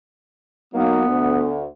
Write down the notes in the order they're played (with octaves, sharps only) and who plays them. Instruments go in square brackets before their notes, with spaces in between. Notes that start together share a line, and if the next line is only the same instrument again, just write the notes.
[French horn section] F#3 A#3 D#4 [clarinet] B3
[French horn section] D2